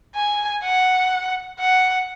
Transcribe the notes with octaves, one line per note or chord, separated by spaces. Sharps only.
G#5
F#5
F#5